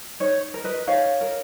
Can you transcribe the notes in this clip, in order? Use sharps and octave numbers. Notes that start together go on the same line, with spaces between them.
D#4 C#5
A#4
B4 D#5
D#4 C#5 F5
A#4